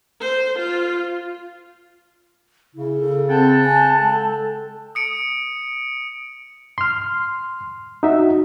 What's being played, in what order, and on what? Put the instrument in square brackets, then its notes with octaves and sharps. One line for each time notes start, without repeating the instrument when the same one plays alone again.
[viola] C5
F4
[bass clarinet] C#3 [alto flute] E4
[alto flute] A4
[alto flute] C4 [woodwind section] F#5 G5 A5
[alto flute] G#5
[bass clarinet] G#3 [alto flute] A4
[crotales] D#6 C#7 D7
[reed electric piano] C6 F6
D#4 F#4 E5